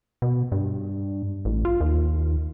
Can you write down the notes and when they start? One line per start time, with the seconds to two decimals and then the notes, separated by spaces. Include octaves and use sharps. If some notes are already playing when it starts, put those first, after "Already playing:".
0.22 B2
0.52 G2
1.45 A1
1.65 F4
1.81 D#2